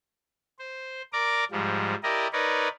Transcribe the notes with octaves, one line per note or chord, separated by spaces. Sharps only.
C5
A#4 D5 A#5 D6
G#2 F3 G3
E4 G4 A#4 D5 D#5
D#4 A#4 B4 C#5 D5